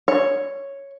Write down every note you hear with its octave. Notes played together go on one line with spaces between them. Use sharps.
C#5